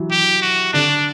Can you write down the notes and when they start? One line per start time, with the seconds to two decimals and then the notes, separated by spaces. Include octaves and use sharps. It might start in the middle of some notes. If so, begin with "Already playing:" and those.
Already playing: E3 F#3
0.11 G4
0.42 F#4
0.73 D3 D4